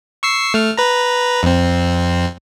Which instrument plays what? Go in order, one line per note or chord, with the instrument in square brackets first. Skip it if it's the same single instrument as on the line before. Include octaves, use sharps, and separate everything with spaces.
[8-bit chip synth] C#6 E6 C7
A3 F6
B4 A#5
F2 C4